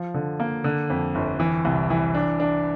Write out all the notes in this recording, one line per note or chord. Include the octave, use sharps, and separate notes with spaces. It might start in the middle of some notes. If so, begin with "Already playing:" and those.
Already playing: F3
D3
A#3
D3
F2
G1
E3
C2
E3
D4
D4